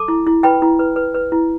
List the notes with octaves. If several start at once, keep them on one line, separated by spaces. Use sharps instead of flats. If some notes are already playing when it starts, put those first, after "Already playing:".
Already playing: A4 A5 D6
E4
E4
B4 G5 B5
E4
B4
B4
B4
E4